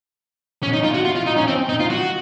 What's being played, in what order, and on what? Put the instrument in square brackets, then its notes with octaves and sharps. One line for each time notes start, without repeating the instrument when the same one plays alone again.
[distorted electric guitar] C#4
D#4
F4
F#4
F4
F4
D#4
C#4
C4
D#4
F4
F#4